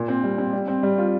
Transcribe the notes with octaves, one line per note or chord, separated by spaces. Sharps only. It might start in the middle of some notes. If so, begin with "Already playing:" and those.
Already playing: A#2
C4
G3
C4
G3
C4
G3
F4